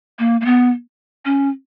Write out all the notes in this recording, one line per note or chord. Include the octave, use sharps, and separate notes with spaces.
A#3
A#3
B3
C#4